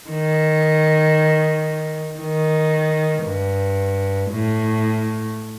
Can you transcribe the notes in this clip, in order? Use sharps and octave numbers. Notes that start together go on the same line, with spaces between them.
D#3
D#3
G2
A2